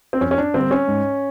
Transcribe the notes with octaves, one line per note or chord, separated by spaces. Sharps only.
C4
F2 C#4
C#4
D4
D3 G3 A#3 C4
C#4
G#2